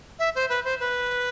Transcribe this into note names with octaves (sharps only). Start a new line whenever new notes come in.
E5
C5
B4
C5
B4